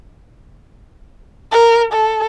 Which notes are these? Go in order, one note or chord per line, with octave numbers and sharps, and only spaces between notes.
A#4
A4